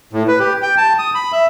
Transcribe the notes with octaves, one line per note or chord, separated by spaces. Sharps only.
A2
B4
G4
G5
A5
D#6
B5
E5